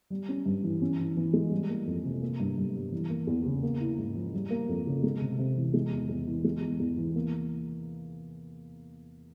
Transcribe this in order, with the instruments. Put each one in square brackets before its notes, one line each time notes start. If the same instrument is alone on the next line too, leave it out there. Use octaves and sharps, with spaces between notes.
[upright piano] G3
C#4
G2
E3
C#4
E3
E3
G#3
G3
A#3
F2
C3
A#3
G2
G2
G3
E3
A#3
E2
C#3
A#3
E4
G#2
F3
G3
A#3
F2
C#3
G#3
C3
C3
E3
G#3
E2
E2
E3
G#3
E2
E2
E3
A#3